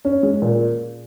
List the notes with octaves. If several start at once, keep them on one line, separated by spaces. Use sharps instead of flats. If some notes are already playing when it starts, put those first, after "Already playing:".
C#4
G#3
A#2